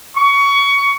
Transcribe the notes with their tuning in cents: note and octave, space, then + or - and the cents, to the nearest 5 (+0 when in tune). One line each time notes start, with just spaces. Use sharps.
C#6 +20